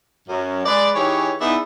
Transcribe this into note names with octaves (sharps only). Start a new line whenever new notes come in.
F#2
G#3 G#4 B4 D5
E3 D#4 G4 G#4 C#5
B3 D#4 E4 G#4 B4 D5